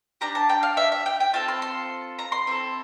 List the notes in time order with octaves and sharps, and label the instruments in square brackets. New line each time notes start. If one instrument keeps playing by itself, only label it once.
[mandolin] D4 G4 A#5
A5
G5
F5
E5
E5
G5
G5
C4 F4 A4 A5
C6
C6
A#5
C6
C4 E4 A4